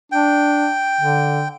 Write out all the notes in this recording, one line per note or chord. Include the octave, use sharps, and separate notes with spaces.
D4 G5
D3